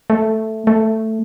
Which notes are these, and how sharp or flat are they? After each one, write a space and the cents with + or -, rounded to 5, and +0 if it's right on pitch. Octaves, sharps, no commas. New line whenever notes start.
A3 +0
A3 +5